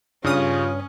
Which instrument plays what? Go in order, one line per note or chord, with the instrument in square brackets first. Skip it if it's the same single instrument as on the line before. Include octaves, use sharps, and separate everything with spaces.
[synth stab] G2 D#6 [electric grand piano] C#3 F6 [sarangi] C#4 [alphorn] F4